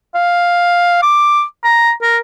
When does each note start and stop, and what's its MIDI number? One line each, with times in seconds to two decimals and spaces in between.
0.15 1.02 77
1.03 1.43 86
1.64 1.92 82
2.02 2.18 70